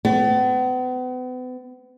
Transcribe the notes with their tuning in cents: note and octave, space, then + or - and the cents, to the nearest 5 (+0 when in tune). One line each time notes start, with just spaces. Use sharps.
B3 +40